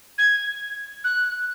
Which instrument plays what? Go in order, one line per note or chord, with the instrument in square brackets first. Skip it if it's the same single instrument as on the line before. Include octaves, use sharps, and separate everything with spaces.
[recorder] G#6
F#6